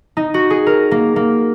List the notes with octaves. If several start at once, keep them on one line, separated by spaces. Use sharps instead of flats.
D#4
F#4
G#4
A#4
A#3
A#3